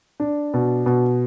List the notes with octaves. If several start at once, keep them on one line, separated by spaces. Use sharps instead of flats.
D4
B2
B2